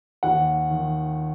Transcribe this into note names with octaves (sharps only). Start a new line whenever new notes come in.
D#2 F#5
D#3